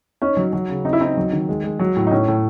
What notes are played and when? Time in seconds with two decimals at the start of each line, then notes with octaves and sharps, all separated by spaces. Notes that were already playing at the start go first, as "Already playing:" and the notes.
0.22 C#4 D#4
0.37 F#3
0.53 F#3
0.69 C#3
0.85 C4 D#4
0.93 E4
1.01 C4 D#4
1.17 F#3
1.33 D#3
1.49 G#3
1.64 G#3
1.79 F#3
1.96 A2
2.07 D#4
2.11 A2 C#4
2.28 A2